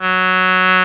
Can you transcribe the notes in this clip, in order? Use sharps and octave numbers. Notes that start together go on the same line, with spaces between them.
F#3